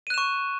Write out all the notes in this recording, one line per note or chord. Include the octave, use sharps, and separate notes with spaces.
C#6 F#6 D#7 E7